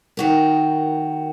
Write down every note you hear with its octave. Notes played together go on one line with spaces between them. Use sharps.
D#3 F#4 A#4